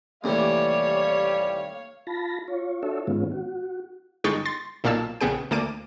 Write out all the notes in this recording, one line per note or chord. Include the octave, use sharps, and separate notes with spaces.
D#2 C3 E3 G3 A3 A#3 C#5 F5
F4 A5 B5 A#6
F4 C#5
D4 F#4 A4 C#5 E5
G#2 D#3 G#3 B3 C#4 F4
F#4
G1 G#3 D#4 G5 C#6 A6
C6 A6
B1 A#2 A#3 F5 A5 E6
A#1 C#3 B3 G#4 G5
D2 A#3 A5 D6 D#7